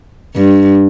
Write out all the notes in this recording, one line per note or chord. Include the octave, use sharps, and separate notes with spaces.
G2